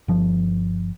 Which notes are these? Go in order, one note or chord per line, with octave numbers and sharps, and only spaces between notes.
G1 F3